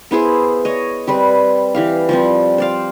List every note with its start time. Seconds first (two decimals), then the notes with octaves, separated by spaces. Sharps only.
0.11 B3 E4 G#4 C5
0.65 C#5 D#5
1.07 G3 C4 B4
1.75 E3 G4 F5
2.09 F3 G3 C4
2.58 C5 D5 F5